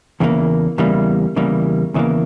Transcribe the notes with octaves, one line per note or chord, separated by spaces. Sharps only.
E2 C#3 E3 G3 A#3
E2 C#3 E3 G3 A#3
E2 C#3 E3 G3 A#3
E2 C#3 E3 G3 A#3